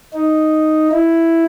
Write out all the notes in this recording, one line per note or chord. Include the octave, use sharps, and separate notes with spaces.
D#4
E4